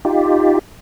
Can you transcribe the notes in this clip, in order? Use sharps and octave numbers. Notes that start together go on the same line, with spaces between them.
D#4 F4 G4